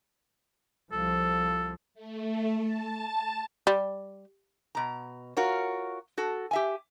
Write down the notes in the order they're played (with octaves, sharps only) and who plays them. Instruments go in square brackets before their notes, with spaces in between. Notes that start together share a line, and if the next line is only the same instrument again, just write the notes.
[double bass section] C2 F3 [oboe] A4
[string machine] A3
A5
[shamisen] G3
[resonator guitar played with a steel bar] B2 A#5
F4 F#4 A#4 C#5
F#4 A4
G4 E5 G#5